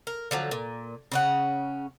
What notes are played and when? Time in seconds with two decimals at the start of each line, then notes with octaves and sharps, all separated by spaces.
0.07 A#4
0.31 D3 F3 F#3
0.51 A#2
1.12 C#3 C#4 F#5